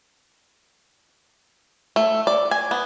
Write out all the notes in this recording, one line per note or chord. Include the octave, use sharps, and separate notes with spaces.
A3
D5
G#5
B3